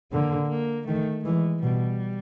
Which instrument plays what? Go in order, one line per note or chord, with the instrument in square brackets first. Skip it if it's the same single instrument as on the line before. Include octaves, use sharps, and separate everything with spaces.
[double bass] D3 [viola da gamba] A#3
[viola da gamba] A#3
[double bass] D#3 [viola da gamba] A3
[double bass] E3 [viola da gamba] G#3
[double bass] B2 [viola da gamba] G3